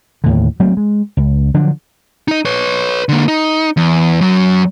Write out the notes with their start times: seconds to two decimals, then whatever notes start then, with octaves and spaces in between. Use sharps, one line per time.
0.24 D#2 A2 D3
0.60 F#3 A3 A#3 C4
0.77 G#3
1.17 C#2
1.54 D3 F3 F#3 D4
2.28 D#4 D#5
2.45 B4 C#5
3.09 D3 A#3
3.28 D#4
3.77 E2
4.21 F#2 F#3